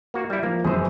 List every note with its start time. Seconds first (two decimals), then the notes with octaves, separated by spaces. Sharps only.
0.14 A#3 F#4
0.30 G3 E4
0.43 F3 A#3
0.64 F1 F#2 E3 G#4 C5